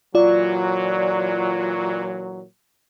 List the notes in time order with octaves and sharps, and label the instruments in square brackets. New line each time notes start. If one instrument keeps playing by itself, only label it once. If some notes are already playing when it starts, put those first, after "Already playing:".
[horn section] A#2 E3 F#3 [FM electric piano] F4 D5